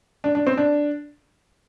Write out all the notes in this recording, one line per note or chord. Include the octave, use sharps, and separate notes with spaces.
D4
D4
C4
D4